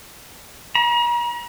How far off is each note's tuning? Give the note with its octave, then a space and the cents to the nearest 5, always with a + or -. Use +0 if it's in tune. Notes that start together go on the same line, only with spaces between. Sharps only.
A#5 +40